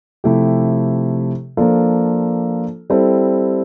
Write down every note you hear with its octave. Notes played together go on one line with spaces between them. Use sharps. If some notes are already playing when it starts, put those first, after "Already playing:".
C3 F3 A3 E4 G4
F3 A#3 D4 F4 A4
G3 C4 E4 A4